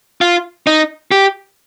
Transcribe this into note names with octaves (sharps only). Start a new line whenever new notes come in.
F4
D#4
G4